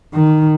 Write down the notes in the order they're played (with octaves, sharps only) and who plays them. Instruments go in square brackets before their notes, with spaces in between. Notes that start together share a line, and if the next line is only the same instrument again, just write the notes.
[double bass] D#3